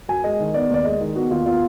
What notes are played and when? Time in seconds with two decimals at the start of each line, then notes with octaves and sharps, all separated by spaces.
0.09 F#2 G#5
0.24 G#3 D#5
0.40 D#3
0.54 B3 D5
0.70 D#2 D5
0.84 G#3 D#5
1.01 D#3
1.16 B3 F#4
1.31 D#2 F4
1.46 B3 F4